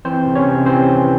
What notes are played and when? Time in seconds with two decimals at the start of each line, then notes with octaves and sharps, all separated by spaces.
0.05 E3 C4 C5
0.26 C3
0.35 C#4 C#5
0.46 C3
0.66 E3 C4 C5
0.86 E3